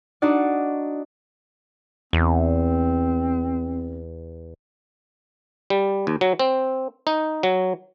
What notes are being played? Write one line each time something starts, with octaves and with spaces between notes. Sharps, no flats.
D4 D#4 F#4 D5
E2 C4
G3
D#2
F#3
C4
D#4
F#3